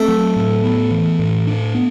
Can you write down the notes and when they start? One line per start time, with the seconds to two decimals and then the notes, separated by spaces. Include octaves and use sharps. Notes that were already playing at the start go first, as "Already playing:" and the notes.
Already playing: A3 C4
0.08 F#3
0.36 A2
0.63 B3
0.91 E3
1.19 A2
1.47 D4
1.75 B3